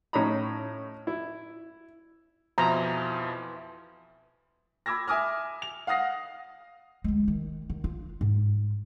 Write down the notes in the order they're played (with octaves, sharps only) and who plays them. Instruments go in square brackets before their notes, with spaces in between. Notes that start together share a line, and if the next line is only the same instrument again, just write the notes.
[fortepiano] A2 C#4 D#4 A#5 B5
E4
[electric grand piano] F2 B2 F3 [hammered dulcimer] E3 C5 C6 [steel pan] A#5
[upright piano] B5 D6 E6 G#6 A#6
E5 G#5 D6 D#6 F6
F7
F5 F#5 D#6 A#6 C7
[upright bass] D2 G#3
D#3
D#3
F4
G#2